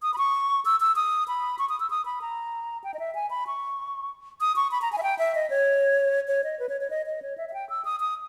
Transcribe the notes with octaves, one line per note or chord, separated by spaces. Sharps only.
D#6
B5
C#6
E6
E6
D#6
B5
C#6
D#6
E6
D#6
B5
A#5
G5
D#5
E5
G#5
B5
C#6
D#6
C#6
B5
A#5
G#5
E5
G5
E5
D#5
C#5
C#5
D#5
B4
C#5
C#5
D#5
D#5
C#5
E5
E5
G5
E6
D#6
D#6